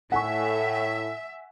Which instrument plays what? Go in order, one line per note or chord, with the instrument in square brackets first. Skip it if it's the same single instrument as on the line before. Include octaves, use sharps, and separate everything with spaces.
[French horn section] A2 [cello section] E5 [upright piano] F#5 G#5 C#6